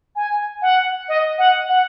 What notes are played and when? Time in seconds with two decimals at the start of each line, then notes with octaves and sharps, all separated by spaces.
0.16 G#5
0.62 F#5
1.08 D#5
1.38 F#5
1.69 F#5